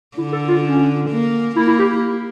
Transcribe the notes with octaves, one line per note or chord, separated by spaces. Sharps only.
D3 E4
A4
F4
C#4
A#3
A#3 E4
E4
G4